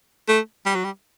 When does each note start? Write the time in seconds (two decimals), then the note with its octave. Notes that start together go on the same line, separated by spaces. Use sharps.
0.28 A3
0.66 G3
0.75 F#3
0.84 G3